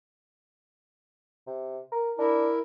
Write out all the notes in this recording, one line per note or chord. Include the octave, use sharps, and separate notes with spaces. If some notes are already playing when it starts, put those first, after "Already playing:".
C3
A#4
D4 E4 A#4